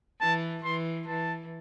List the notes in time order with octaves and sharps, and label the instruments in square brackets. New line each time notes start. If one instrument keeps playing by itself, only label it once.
[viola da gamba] E3 [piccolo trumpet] A5
[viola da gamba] E3 [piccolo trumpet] C6
[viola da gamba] E3 [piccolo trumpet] A5